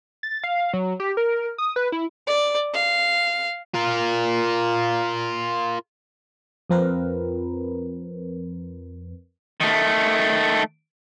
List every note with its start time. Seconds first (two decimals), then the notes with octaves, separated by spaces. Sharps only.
0.23 A6
0.44 F5
0.73 F#3
1.00 G4
1.17 A#4
1.58 D#6
1.76 B4
1.92 E4
2.27 D5
2.73 F5
3.74 F4 A#4
6.70 F2 F3 C4 A#4 B4
9.61 D#3 A3